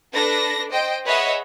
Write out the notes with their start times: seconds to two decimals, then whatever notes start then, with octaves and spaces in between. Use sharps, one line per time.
0.13 D4 A4 B4 A#6
0.70 C5 D#5 G5
1.05 G#4 B4 C#5 D#5 E5 F#5